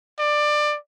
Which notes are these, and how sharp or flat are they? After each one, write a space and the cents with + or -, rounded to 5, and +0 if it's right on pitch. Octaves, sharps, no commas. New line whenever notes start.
D5 +20